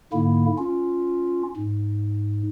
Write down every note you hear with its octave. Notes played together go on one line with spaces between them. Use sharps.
G#2 D3 A#3 E4
C#4 F4
G#2